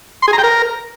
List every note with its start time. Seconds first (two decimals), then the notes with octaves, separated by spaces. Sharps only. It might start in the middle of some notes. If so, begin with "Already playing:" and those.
0.22 C6
0.28 G#4
0.33 A#5
0.38 G5
0.44 A#4